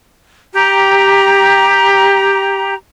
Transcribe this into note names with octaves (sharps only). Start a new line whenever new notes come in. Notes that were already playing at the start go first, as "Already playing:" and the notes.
G4 A#5